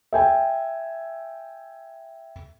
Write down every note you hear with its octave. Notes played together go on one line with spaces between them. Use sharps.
E5 G5 G#5